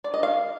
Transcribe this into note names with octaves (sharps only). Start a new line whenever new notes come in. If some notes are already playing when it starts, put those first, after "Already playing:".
D5
D#5
F5